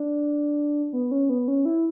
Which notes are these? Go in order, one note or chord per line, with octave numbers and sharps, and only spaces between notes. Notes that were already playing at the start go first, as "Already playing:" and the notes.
Already playing: D4
B3
C#4
B3
C#4
E4